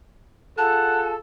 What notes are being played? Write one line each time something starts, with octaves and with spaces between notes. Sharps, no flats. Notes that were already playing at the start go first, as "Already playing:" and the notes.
F4 G#4 A4 F#5 A5